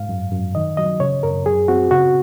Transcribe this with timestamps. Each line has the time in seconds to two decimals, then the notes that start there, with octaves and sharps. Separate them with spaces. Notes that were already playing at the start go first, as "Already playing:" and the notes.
Already playing: G#2 F5
0.09 F#2
0.32 F#2
0.55 D#3 D#5
0.77 F#3 D#5
1.00 C#3 C#5
1.23 F#2 A#4
1.46 F#2 G#4
1.68 C4 F#4
1.91 C#3 F#4